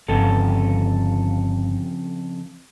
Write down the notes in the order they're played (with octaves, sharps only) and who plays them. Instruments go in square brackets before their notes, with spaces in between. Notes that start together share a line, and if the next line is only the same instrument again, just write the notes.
[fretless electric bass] G1 [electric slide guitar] F2 C#3 A4